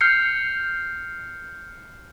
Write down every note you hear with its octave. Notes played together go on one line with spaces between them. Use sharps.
F6 G6 C7 C#7